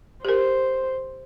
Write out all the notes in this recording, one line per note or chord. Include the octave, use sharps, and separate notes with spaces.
G4 A#4 C5